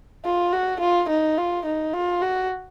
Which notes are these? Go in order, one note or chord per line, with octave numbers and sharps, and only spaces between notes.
F4
F#4
F4
D#4
F4
D#4
F4
F#4